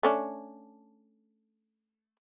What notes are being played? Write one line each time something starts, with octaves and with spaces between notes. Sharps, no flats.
A3 C#4 D4